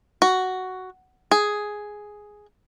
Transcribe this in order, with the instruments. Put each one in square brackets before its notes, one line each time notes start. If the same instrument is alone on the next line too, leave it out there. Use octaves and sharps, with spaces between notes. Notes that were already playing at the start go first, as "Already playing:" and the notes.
[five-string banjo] F#4
G#4